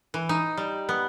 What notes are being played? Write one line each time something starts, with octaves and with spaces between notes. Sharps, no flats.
E3
D#4
G3
B3